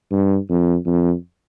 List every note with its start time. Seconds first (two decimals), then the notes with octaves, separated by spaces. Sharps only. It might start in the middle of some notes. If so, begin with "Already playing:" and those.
0.11 G2
0.50 F2
0.86 F2